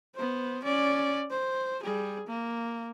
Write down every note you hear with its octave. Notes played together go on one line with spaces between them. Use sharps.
B3 C5
C#4 D5
C5
G3 G#4
A#3